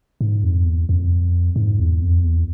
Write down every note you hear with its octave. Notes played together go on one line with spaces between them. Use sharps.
G#2
F2
E2
F2
G#2
E2
F2
E2